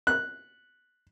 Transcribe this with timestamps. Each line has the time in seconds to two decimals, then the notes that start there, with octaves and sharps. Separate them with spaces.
0.07 F#6